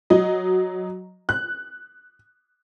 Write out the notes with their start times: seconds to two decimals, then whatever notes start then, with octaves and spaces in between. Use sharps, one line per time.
0.10 F#3 D#5
1.29 F#6